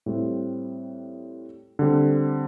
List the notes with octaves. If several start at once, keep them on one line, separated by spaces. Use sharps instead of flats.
A2 G3 C4
D3 G3 C4